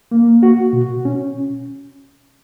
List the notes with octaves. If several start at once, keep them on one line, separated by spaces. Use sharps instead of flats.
A#3
F#4
B2
C#4